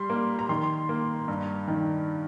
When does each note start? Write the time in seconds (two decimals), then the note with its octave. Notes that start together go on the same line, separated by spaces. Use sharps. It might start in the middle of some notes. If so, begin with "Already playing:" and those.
Already playing: G3 C6
0.10 A#3
0.39 A#5
0.49 D#3 C6
0.89 A#3
1.28 G2
1.68 D#3